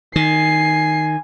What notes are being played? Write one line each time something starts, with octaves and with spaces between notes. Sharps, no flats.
D#3 G#5 C7